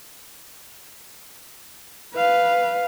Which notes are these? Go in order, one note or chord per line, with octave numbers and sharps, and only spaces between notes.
B4 F5